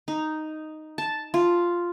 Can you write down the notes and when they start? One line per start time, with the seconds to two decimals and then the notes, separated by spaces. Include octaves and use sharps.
0.08 D#4
0.98 A5
1.34 F4